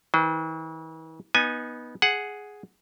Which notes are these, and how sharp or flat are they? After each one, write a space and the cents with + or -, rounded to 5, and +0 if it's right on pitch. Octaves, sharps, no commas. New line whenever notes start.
E3 -45 C5 -40
B3 -15 D#4 +0 G#5 +0
G#4 +0 F#5 +0